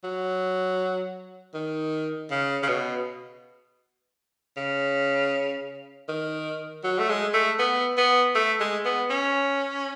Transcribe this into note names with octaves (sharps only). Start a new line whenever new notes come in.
F#3
D#3
C#3
C#3
B2
C#3
D#3
F#3
A3
G#3
A3
B3
B3
A3
G#3
B3
C#4